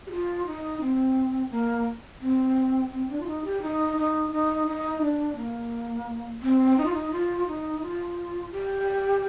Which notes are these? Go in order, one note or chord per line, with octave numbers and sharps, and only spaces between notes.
G4
F4
D#4
C4
A#3
C4
C4
D4
F4
D#4
G4
D#4
D#4
D#4
D#4
D4
A#3
C4
D#4
F4
D#4
F4
D#4
F4
G4